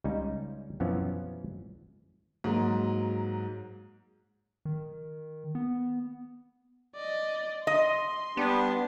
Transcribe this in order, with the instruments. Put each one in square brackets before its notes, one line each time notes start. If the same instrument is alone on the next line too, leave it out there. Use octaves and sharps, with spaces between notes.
[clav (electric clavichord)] C#2 G3 C#4 D#4
F#2 B2 E3 F3 B3 C#4
[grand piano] G#2 F#3 A#3
[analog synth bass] D#3
B3
[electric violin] D5 D#5
[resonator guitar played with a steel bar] D#5 [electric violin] C6
[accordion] G3 D4 G4 [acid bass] B3